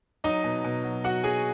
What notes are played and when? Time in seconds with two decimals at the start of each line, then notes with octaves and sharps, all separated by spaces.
0.24 F#3 D#4 D#5
0.44 B2
0.64 B2
0.84 F#3
1.04 F#3 F#4 F#5
1.24 F#3 G#4 G#5